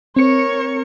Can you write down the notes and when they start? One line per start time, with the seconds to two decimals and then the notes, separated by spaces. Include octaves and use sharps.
0.16 C4 A#4 C#5 C#7